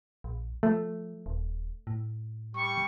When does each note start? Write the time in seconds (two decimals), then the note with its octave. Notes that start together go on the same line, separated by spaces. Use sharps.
0.24 A#1
0.63 F3 A3
1.26 D#1
1.87 A2
2.55 G3 C#6